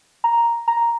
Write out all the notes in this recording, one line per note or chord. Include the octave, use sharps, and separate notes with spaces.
A#5
A#5